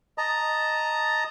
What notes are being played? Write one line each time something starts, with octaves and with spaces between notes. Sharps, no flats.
D#5 A5 A#5